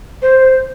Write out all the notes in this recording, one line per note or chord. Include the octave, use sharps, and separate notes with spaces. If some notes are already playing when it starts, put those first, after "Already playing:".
C5